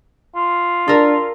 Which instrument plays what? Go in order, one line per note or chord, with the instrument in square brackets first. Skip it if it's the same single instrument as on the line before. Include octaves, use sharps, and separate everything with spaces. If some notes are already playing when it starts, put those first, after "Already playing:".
[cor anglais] F4
[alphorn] D4 [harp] A4 A#4